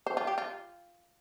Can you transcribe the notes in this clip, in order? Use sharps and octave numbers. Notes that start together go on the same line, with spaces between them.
C5
F4
G4
F4